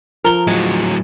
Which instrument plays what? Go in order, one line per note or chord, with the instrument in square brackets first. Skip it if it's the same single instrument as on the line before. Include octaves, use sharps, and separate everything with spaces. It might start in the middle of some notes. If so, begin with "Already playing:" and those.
[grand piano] F3 G7 [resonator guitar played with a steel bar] A#4
[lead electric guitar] A2 F#3 [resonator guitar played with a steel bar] G#3